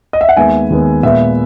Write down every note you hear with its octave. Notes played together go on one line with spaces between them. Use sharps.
D#5
E5
F#5
D#2 D#3 G#3 B3 E5 G#5
D#2 D#3 G#3 B3
A#2 G#3 B3 E5